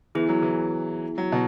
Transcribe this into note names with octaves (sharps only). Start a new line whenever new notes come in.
E3 B3 E4 G#4
F#3
E3
F#3
B2